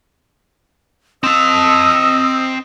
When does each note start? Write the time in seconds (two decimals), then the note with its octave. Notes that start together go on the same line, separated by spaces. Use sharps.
1.24 C4 D#5 A5 E6